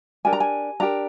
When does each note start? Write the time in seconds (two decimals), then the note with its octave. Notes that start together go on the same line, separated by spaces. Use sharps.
0.25 D4 G4 A#4 G#5
0.33 A#5
0.40 G#5
0.80 D4 G4 A#4 A#5